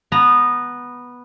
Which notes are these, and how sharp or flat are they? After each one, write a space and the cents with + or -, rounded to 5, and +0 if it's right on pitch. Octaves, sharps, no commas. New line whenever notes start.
B3 -5 A#5 +0